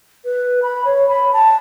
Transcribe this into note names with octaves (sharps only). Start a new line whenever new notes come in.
B4
B5
C#5
B5
A5